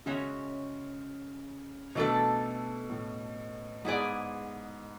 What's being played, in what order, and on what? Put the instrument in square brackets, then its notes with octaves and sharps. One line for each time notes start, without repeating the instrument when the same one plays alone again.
[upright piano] C#3 [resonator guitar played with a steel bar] G#3 C#4 F#4 C#5 E5
[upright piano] B2 [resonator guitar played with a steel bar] E3 A3 D4 A4
[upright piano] A2
[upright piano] G#2 [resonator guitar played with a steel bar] B3 E4 G#4 D5